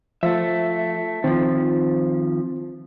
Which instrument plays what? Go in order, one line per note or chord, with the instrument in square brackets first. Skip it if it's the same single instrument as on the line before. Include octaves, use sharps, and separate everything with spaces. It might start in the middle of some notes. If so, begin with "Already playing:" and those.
[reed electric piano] F3 F4 [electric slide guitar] A3 E5
[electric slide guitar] D#3 F3 [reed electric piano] C4